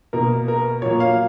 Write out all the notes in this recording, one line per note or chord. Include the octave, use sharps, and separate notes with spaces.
B2 A#3 A#4
A#4
A#2 F#3 A#3 C#5
F5